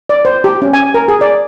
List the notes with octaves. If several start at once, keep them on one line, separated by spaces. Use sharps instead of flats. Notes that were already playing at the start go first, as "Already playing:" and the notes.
D5
C5
G4
C#4
G#5
A#4
G#4
D5